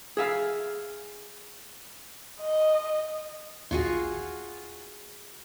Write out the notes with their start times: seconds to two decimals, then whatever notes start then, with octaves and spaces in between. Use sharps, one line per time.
0.17 G#4 E5 F5
2.41 D#5
3.71 A#1 D#2 F4 F#4 G#4